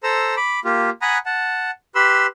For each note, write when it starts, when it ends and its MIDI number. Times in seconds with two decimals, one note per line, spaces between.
0.03 0.35 69
0.03 0.35 72
0.03 0.35 82
0.03 0.35 88
0.37 0.60 83
0.37 0.60 86
0.65 0.90 58
0.65 0.90 65
0.65 0.90 67
1.02 1.18 78
1.02 1.18 80
1.02 1.18 82
1.02 1.18 83
1.02 1.18 87
1.02 1.18 90
1.26 1.71 78
1.26 1.71 81
1.95 2.26 67
1.95 2.26 71
1.95 2.26 83
1.95 2.26 84
1.95 2.26 88